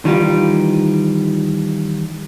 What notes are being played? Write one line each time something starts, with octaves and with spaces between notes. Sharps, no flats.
D#3 E3 G3 D#4 F4 G4